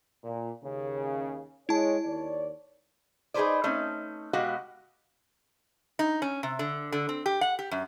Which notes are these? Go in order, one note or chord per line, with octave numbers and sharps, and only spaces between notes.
A#2
D#2 C#3
G#3 E4 G#4 C#5 A5
D#2 C#5 D5
D#4 G#4 A4 B4 C5 D5
A3 C4 C#4 D#4
B2 G#3 F#4 G4 F5 F#5
D#4
C#4
C3
D3
D3
C4
G4
F#5
G4
F#2